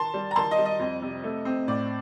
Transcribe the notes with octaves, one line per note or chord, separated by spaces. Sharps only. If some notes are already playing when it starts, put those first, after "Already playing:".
Already playing: D#3 A5 C6
G3
A#5
D#3 A5 C6
D#5
G3
D#5
F2
C3
A3
C4
A2 D5